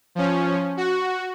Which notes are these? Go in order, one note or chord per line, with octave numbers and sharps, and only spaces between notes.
F3 C#4
F#4